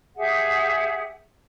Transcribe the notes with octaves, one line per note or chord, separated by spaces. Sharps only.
G4 G#4 E5 F#5